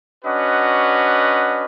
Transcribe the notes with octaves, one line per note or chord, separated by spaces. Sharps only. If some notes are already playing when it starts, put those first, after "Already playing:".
C#4 D4 F#4 B4 D#5 F#5